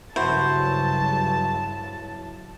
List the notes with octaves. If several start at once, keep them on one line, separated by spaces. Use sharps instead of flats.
G2 C#3 F#3 E4 F#4 C5 A5